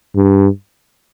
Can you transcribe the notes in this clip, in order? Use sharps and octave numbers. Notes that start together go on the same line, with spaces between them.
G2